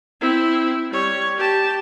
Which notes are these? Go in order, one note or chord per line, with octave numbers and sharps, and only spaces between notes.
C4 E4
G3 C#5
G4 A5